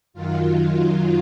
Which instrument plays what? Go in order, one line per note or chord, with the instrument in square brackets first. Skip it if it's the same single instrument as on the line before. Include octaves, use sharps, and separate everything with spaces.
[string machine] F#2 D#3 F#3 F4